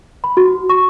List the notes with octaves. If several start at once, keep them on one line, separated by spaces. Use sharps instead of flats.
B5
F#4
C#6